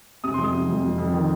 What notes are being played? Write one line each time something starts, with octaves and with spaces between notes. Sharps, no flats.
C3 D#6
F2 C6
D#6
C3
F2
F2
F2
D#3